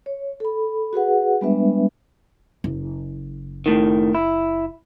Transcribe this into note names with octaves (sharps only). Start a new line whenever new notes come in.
C#5
A4 B5
F#4 G#4 B4 F#5
G3 G#3 B3 D4 B4 E5
F#1
A2 D#3
E4